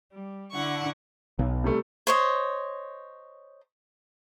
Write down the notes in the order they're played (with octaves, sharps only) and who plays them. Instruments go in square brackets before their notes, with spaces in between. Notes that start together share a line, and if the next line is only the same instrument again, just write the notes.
[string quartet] G3
D3 E4 F#5 C#6
[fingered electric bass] B1
[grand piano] C3 G3 A3
[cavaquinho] C5 C#5 D#5